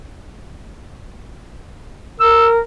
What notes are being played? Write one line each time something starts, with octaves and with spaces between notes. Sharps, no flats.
A#4 E6